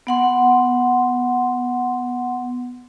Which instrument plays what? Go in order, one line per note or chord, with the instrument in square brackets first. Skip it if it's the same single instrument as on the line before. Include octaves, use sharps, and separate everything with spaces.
[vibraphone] B3 F#5 C6